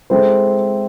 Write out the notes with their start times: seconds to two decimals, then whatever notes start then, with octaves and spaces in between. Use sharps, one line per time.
0.10 G#3 C4 E4 A4 C5